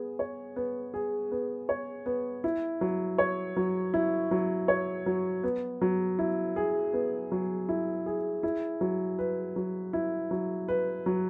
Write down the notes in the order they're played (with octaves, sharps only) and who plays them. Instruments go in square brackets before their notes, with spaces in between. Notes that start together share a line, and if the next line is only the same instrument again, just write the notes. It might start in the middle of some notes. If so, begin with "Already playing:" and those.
Already playing: [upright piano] B3 G#4
C#5
B3
G#4
B3
C#5
B3
E4
F#3
C#5
F#3
E4
F#3
C#5
F#3
B3
F#3
E4
G#4
B3
F#3
E4
G#4
E4
F#3
B4
F#3
E4
F#3
B4
F#3